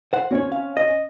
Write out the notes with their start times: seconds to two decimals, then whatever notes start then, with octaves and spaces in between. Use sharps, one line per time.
0.13 C5 F#5
0.31 C4 C#4 F#4 C#5
0.52 F5
0.77 D#5